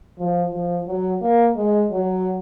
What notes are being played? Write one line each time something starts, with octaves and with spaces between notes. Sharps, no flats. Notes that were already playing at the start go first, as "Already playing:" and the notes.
F3
F3
F#3
A#3
G#3
F#3